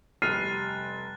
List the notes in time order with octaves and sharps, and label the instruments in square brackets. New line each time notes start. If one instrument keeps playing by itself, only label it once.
[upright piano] F1 G3 [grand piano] F6 C7 D#7 [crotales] F#6 A6